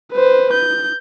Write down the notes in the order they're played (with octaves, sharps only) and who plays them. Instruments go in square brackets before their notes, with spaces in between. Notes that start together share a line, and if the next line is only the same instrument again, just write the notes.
[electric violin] B4 C5
G6